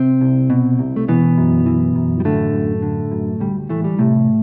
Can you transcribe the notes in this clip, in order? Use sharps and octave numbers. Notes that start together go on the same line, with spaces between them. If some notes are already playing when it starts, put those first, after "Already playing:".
Already playing: C3 C4
C2
B2
C2
A3
B2 E3 B3
F#2
E3
F#2
G3
A2 D3 A3
F#2
D3
F#2
D2 G3
A2 E3 A3
G3
A2 C3 A3